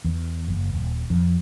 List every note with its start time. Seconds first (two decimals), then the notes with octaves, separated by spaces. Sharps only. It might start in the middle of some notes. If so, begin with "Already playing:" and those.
0.04 E2
0.48 F#1
0.73 D#1
1.10 F2